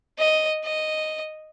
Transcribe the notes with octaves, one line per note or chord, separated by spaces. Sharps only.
D#5
D#5